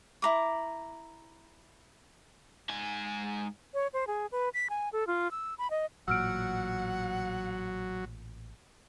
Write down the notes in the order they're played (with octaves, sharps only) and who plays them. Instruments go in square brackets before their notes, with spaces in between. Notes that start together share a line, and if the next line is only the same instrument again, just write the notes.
[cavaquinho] E4 A#5 D6
[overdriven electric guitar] G#2 G#5
[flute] C#5
C5
G#4
B4
B6
G#5
A4
F4
E6
B5
D#5
[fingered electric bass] A1 A#2 [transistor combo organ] F#3 [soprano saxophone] F#5 [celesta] E6 F6 D7